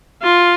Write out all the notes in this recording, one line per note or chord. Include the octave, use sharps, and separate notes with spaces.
F4